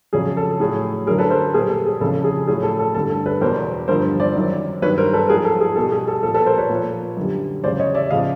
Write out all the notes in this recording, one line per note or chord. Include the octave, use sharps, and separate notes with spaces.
F2 C#3 F#3 G#4
A4
A2 F#3 G#4
F#2 D3 F#3 G#4 A#4
A4 B4
A#4 C5
A#2 G3 G#4 A#4
A4
G#4
F2 C#3 E3 A4
G#4
A2 F#3 G#4
A4
A4
G2 D3 G3 A4
A4
A4 B4
E2 B2 F#3 A#4 C5
G2 D3 F3 A#4 C5
C5 D5
F#2 D#3 F#3
G2 D#3 F#3 B4 C#5
A#4 C5
A4 B4
G#2 F3 G#4 A#4
A4
G#4
B2 G3 A4
G#4
A4
A#2 F3 A4
A4 B4
A#4 C5
B4 C#5
A#2 F3
F#2 D3 G3
E2 C#3 F#3 C5 D5
C#5 D#5
D5 E5
C#3 F3 D#5 F5